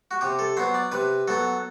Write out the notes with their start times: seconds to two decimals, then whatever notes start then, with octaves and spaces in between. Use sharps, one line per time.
0.11 F#4
0.21 C3 G4
0.39 A4
0.57 F#3 B3 C5
0.74 D5
0.92 C3 B4
1.28 F#3 B3 A4